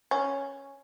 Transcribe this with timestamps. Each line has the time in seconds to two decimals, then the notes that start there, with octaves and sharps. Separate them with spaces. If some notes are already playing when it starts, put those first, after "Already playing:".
0.11 C#4